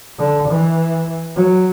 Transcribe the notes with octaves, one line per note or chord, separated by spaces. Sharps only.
D3
E3
F#3